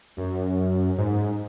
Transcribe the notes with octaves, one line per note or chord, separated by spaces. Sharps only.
F#2
G#2